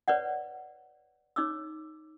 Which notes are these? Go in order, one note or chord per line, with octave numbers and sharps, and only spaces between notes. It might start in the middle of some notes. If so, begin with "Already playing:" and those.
B4 C#5 D5 F#5
D#4 C#5 D6 E6